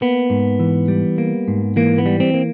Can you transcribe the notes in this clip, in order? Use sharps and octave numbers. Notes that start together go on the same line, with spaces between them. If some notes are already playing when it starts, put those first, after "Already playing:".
A#3 B3
G#2
E3
G3
A#3
G#2
E3 A#3
B3
G3
C4
A#3